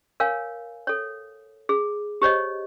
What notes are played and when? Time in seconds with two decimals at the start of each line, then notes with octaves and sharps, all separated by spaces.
0.20 A#4 C#5 F5 G#5
0.87 A4 C#5
1.69 G#4
2.22 G4 C5 C#5 D#5